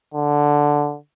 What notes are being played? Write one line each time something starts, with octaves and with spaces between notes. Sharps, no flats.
D3